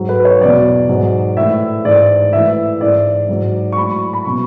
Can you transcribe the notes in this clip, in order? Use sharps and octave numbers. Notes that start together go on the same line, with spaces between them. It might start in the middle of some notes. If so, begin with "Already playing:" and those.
Already playing: G#2 F#3
B4
C#5
E2 B2 F#3 D5
G#2 F#3
A2 E3 E5
G#2 E3 D5
A2 E3 E5
G#2 E3 D5
G#2 F#3
C#6
A2 F#3 B5
B5
B2 F#3 C#6